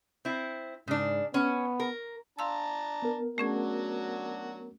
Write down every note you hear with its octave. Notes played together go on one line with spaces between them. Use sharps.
C4 E4
G#2 C#3 D4
B3 C#4
A#4
D4 F5 A5 A#5 C6 E6
B3 A#4
F#3 A3 C#4 D4 F#4 G#4